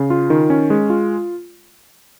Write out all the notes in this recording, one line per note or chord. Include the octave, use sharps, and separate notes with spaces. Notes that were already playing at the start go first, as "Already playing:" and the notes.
Already playing: C#3
F4
D#3
C#4
G#3
F4